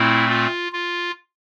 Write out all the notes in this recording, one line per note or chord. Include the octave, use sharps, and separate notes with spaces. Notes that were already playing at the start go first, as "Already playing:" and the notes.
Already playing: A#2 A3 C4 E4
F4
F4